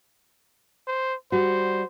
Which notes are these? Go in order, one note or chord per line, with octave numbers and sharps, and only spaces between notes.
C5
G3 F#4 C5